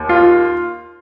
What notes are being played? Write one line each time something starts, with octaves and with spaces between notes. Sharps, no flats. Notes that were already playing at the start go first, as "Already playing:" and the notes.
Already playing: D#2
F4